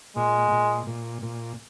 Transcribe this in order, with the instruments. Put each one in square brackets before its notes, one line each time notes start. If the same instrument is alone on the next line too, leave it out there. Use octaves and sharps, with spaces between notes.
[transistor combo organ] A#2 [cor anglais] G#3
[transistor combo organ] A#2
A#2
A#2